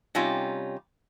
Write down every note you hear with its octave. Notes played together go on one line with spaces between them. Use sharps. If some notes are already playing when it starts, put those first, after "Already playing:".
C3 G3 C#4 D#4 F4